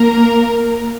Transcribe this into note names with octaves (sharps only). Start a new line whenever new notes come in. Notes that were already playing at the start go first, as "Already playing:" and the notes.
Already playing: A#3 A#4